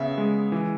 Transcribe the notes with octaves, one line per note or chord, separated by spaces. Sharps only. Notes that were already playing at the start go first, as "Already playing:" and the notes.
Already playing: C#3 B3 E5
G#3
E3